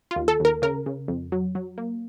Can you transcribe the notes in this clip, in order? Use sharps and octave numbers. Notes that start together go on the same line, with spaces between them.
F4
D#2
A4
D#2 A#4
C#3 A#4
C#3
F2
F#3
F#3
A#3